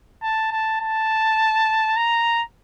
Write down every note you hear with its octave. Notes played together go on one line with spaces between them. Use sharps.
A5
A5
A5
A#5